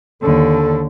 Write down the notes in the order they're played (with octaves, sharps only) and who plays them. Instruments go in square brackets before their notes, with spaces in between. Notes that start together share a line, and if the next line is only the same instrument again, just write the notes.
[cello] D#2 D3 [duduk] A4